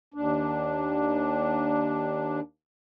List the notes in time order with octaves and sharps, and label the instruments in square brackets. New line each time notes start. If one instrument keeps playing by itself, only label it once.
[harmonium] D#2 D4